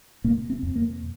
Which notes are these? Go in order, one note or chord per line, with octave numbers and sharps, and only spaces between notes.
C3 A#3
C4
F2
A#3